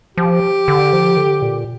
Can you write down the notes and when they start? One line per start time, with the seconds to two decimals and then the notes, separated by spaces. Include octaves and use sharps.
0.17 F3 G4
0.68 D3
0.93 F3
1.17 D3
1.42 A#2